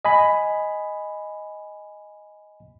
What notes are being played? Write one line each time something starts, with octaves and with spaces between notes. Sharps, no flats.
D#5 G#5 B5